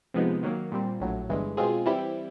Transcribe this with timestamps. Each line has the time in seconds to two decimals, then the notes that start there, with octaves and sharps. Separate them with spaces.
0.14 C3 F3 G#3 B3 D#4
0.43 D#3 F#3 A#3
0.72 A#2 G3 C4
1.00 A#1 A2 F#3
1.29 G1 G2 E3 G#3
1.57 B2 G#3 C4 F4 G#4
1.86 E3 G3 C4 E4 G4